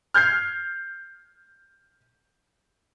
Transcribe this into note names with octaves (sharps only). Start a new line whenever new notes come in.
F6 G6 G#6 C7